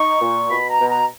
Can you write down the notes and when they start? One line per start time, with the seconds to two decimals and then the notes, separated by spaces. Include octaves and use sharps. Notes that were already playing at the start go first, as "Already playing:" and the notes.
Already playing: D#4 C#6
0.22 A#2
0.51 B2 B5
0.70 A#5
0.80 B2
0.89 A#5